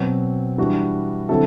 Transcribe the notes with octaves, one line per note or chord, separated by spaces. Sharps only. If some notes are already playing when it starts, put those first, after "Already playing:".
Already playing: B2 F#3 C4
E3 G3 D4 F#4
D3 F#3 C4 E4 A4